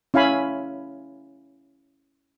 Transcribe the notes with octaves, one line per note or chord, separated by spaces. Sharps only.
C#4 E4 F5 G#5 B5